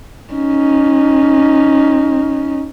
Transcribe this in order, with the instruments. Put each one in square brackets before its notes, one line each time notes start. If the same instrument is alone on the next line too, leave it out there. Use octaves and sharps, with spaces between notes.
[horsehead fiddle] C#4 D#4